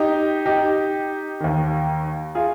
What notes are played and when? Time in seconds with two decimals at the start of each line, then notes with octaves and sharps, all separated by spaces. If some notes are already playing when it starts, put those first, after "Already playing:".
Already playing: D#4 G4
0.46 D#4 G4
1.40 D#2 D#3
2.35 F4 G#4